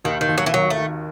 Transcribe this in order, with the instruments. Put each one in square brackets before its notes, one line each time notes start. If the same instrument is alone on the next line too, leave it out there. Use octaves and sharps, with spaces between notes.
[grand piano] D#2 [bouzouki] D#3
[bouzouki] D#3
[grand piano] D#2
[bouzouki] F#3
E3
[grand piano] D#3 [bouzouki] F#3
[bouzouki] A3
[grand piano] D#3